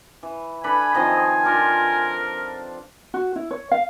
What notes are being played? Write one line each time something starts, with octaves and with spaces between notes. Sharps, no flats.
E3
D4 A4 B4 G#5 B5
D#3 F3 C4 D#5
D4 F4 A#4
F#4
E4
C#5
F5